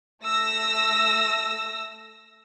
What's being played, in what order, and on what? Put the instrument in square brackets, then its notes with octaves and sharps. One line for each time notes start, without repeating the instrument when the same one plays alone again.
[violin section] A3 E6 A#6